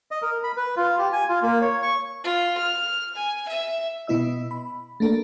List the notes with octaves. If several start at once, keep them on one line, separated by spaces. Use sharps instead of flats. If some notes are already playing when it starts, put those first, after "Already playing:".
D#5
A#4
B5
B4
F4
G4
G#5
F4
A#3
C#5
C#6
F4
F6
G#5
E5
B2 B3 E4 D#5 E6
B5
A3 A#3 D4 A4 A#4